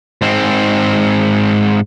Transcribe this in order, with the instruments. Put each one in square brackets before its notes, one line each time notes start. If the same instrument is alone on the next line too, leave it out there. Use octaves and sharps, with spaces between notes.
[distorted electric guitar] G#2 C4